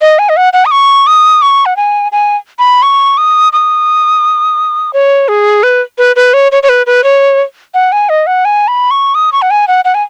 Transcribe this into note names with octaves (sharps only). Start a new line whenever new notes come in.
D#5
G#5
D#5
F#5
F#5
D#6
C#6
D#6
C#6
F#5
G#5
G#5
B5
C#6
D#6
D#6
C#5
G#4
B4
B4
B4
C#5
C#5
C#5
B4
B4
C#5
F#5
G#5
D#5
F#5
G#5
B5
C#6
D#6
C#6
F#5
G#5
F#5
F#5
G#5